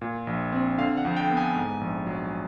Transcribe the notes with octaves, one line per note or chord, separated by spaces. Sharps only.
A#2
A#1
C4
D3 F5
F#5
F2
G5
B3
G#5
G#2
A#1
F#3